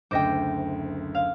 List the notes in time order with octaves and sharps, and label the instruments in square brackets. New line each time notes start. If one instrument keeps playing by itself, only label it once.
[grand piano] F#1 D2 [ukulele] C5 D#5 G5 [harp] D6
[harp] F5